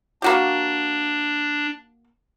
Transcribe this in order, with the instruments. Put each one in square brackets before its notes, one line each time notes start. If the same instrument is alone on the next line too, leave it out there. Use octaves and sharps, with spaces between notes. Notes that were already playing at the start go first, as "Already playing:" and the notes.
[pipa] A#3 F#4 G4 [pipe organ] D4